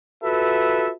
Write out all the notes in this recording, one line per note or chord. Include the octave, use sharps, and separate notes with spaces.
F4 F#4 A4 B4 E5